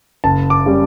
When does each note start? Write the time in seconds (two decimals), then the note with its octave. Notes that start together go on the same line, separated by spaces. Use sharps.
0.24 F#1 A5
0.50 D6
0.66 C#3 G3